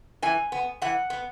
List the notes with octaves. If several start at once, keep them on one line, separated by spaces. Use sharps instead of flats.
E3 G#5
B3
E3 F#5
B3